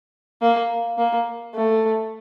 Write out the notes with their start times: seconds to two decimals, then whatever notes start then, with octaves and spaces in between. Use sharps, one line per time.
0.42 A#3
0.98 A#3
1.55 A3